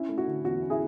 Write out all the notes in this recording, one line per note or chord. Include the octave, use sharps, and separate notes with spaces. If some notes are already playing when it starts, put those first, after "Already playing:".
Already playing: C#4 E4
A3
F#4
D3
E2 F#4
C#4
E4 G#4